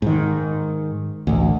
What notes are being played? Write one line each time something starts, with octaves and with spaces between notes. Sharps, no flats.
G#2 D#3
A1 D2